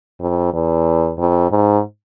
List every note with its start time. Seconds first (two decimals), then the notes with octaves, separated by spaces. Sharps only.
0.20 F2
0.53 E2
1.18 F2
1.51 G#2